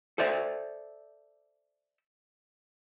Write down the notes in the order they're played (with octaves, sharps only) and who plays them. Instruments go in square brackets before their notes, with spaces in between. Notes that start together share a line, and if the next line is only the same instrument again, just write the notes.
[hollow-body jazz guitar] A4 C5 D5 E5